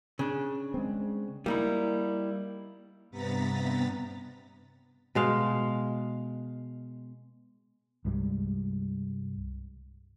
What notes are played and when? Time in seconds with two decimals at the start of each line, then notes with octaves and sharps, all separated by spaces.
0.19 C#3 D4
0.74 G#3 C4
1.46 G3 A#3 D#4 E4
3.11 G2 C3 B3 A#5 A6 B6
5.15 B2 G#3 F5
8.05 C2 G2 G3 G#3